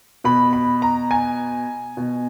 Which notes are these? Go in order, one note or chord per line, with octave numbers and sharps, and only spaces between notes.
B2 B5
B5
A#5
G#5
B2